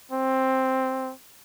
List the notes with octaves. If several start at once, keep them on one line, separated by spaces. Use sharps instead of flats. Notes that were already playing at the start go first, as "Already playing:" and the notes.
C4